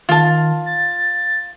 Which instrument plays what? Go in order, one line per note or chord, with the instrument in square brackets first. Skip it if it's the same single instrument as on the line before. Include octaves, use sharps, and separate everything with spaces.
[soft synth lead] D#3 [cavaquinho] F4 A5
[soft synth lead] A6